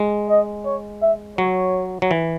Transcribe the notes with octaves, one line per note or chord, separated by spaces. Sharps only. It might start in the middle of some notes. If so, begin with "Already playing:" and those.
Already playing: G#3
D#5
C#5
E5
F#3 C#5
F#3
E3